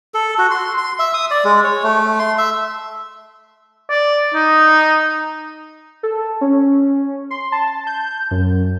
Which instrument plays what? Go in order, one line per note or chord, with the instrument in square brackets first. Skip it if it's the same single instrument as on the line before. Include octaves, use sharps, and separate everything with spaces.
[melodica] A4
F#4
C6
C6
E5
D#6
D5
G#3
C#5
A3
C6
E5
[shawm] D5
D#4
[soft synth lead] A4
C#4
C6
A5
G6
F#2